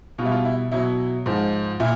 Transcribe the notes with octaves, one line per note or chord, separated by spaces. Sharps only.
B2 G3 E4 F4
F4
E4
B2 F#3 E4
G#2 F3
A#2 E4